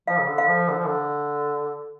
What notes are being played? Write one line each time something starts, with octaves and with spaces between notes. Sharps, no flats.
F3 F5
C#3
D3
F5
F3
D3 A4
F3
D3